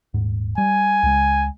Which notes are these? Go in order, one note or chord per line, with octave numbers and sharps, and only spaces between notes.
D#1 G#2
G3 G#5
C#2 G#3